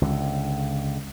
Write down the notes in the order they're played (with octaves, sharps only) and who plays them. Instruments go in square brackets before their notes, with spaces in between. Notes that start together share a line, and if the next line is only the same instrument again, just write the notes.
[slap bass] C#2 D3